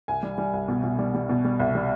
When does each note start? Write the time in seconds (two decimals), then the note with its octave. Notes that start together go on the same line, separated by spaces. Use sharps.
0.08 C2 G#5
0.23 G3
0.38 G3
0.53 C2
0.68 B2
0.84 B2
0.99 G3
1.15 G3
1.29 B2
1.45 G3
1.60 C2
1.75 G3